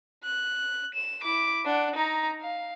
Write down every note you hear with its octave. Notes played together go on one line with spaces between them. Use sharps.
F#6
E7
E4 D6
D4 F#5
D#4 A#5
F5